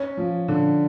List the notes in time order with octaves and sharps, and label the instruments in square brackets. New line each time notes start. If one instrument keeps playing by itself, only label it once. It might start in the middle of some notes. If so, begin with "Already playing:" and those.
Already playing: [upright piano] C#4
F3
D3